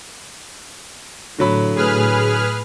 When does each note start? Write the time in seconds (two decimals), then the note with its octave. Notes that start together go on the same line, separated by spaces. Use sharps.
1.38 A2 D3 F#3 B5
1.75 G#4 B4 F6